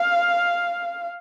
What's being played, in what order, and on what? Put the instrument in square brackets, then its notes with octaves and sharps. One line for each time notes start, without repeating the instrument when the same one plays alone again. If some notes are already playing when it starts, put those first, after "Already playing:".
Already playing: [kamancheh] F5